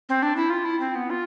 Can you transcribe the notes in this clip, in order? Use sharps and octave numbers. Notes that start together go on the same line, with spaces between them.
C4
D4
E4
F4
E4
C4
B3
F4